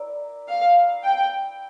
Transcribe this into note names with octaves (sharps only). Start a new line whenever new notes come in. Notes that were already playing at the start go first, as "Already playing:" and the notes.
Already playing: E4 A#4 D5
F5
G5